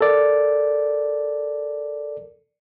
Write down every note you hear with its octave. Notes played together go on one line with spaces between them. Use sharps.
A4 A#4 D5